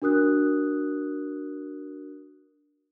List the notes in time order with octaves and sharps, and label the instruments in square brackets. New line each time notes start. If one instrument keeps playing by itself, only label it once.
[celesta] D4 F#4 A#4 D#6 F#6